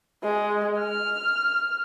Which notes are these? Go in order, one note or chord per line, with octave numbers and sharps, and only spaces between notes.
G#3
F6